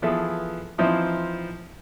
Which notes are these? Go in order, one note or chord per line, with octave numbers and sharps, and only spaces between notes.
E3 F3 B3 E4 G#4 A4
E3 F3 C4 D#4 E4